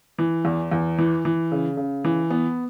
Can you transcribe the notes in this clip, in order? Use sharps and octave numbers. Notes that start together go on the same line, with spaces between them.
E3
E2
E2
E3
E3
C#3
C#3
E3
B3